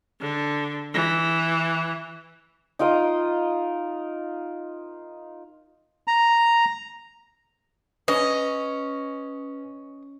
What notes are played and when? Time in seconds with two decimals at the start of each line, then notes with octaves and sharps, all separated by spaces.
0.21 D3
0.94 E3
2.79 D#4 F4 A#4 D#5
6.08 A#5
8.08 C#4 B4 D#5